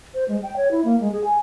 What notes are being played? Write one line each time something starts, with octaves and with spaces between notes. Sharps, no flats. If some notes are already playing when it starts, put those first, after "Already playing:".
C5
G#3
G5
C#5
E4
A#3
G#3
G#4
G#5